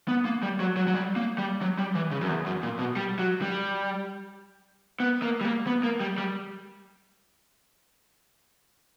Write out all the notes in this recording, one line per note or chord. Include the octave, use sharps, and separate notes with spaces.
B3
A#3
G3
F#3
F#3
F#3
G3
A#3
G3
F#3
G3
E3
C#3
F#2
E2
F#2
A#2
B2
G3
F#3
G3
B3
A#3
G3
A#3
B3
A#3
G3
G3